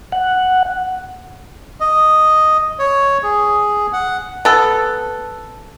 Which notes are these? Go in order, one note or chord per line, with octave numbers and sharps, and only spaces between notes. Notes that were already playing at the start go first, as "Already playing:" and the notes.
F#5
D#5
C#5
G#4
F#5
B3 A4